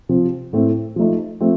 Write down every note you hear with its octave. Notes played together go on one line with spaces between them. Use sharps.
C3 F3 C4
A2 A3 C4
F3 A3 D#4
F3 A3 C4